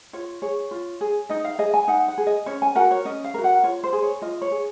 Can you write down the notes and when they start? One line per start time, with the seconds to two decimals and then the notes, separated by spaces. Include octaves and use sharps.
0.13 F4 C#5
0.42 G#4 C#5
0.71 F4
1.01 G#4
1.29 D#4 D#5
1.44 F5
1.59 G#4 D#5
1.74 G#5
1.88 D#4 F#5
2.08 F#5
2.18 G#4
2.27 D#5
2.46 C#4 C#5
2.62 G#5
2.75 F#4 A#4 F#5
2.91 C#5
3.05 C#4 D#5
3.24 F5
3.34 F#4 A#4
3.44 F#5
3.63 F4 C#5
3.83 C5
3.93 G#4
4.02 C#5
4.22 F4 D#5
4.42 C#5
4.51 G#4